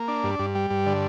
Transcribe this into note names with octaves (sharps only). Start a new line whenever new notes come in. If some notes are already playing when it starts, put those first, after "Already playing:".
Already playing: A#3
D4
G2
G2
G3
G2
D3